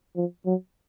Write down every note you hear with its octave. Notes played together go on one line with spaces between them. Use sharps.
F3
F#3